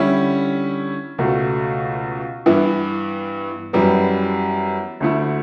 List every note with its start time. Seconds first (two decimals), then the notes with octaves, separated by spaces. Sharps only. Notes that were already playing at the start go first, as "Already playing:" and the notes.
Already playing: D3 G3 C#4 E4
1.18 C#2 B2 A3
2.46 G2 E3 B3 E4
3.73 F#2 E3 G3 B3
5.00 D2 D3 A3 E4